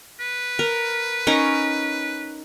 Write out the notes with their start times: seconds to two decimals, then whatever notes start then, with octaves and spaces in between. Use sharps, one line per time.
0.20 B4
0.59 A#4
1.27 C#4 D#4 A#4